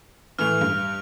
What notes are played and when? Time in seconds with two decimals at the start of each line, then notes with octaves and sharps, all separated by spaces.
0.39 A2 E3 A3 F6 F7
0.61 G2